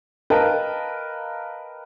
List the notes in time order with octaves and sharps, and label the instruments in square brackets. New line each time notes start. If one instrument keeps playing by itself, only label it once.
[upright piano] A#4 B4 D#5 F5 G5 A5